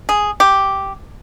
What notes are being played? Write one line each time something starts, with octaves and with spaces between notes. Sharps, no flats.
G#4
G4